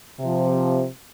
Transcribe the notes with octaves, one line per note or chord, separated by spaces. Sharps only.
C3 F3